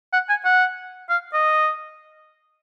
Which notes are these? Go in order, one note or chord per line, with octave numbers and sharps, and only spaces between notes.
F#5
G#5
F#5
F5
D#5